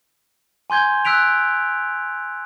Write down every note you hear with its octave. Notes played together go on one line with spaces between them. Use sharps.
G#5 C6 G6 G#6 G7
E6 F#6 B6 D7 F7